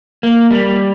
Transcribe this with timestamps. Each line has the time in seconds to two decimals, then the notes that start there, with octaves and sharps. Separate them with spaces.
0.23 A#3
0.51 G3